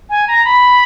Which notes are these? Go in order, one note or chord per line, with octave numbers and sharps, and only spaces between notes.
G#5
A#5
B5